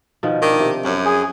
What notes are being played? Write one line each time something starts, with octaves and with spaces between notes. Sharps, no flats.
B2 D#3 F3
D#3 D4
C3
F#2 C#4
G#4